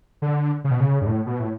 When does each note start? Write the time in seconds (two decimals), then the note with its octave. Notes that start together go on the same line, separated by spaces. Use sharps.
0.22 D3
0.64 C#3
0.71 B2
0.80 C#3
1.01 G2
1.06 A2
1.26 B2
1.40 A2